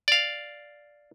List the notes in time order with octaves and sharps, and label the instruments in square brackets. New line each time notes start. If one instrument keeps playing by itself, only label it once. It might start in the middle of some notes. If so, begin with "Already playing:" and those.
[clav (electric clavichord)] D5 F5